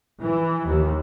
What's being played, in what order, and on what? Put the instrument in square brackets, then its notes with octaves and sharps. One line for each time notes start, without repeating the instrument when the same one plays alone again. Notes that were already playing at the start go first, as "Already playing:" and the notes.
[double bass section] E3
D#2